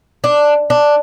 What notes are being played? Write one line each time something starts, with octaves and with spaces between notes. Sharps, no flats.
D4
D4